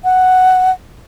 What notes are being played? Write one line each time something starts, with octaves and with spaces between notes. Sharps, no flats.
F#5